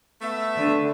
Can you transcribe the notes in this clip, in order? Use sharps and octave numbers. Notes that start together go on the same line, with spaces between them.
A3 B3 E5
D3